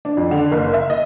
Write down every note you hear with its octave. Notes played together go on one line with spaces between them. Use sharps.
D4
F2
D3
F#1
E5
D#5